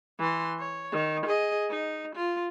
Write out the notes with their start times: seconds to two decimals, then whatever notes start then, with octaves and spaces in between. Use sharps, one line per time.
0.19 E3 C6
0.59 C#5
0.92 D#3
1.26 G#4 D#5
1.70 D#4
2.15 F4